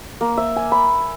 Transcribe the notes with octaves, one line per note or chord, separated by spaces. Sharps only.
A#3
E5
G#5
B5